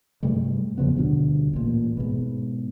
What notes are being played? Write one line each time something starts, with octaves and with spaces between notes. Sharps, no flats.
G2 C3 G3 A3
E2 C#3 F3 B3
D2 G2 B2 D3
A1 A#2
G#2 B2